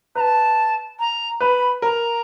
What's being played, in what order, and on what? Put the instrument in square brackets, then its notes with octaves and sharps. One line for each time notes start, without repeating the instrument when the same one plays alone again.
[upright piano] B4 [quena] A5 A#5
[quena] A#5
[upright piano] B4 [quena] B5
[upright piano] A#4 [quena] A#5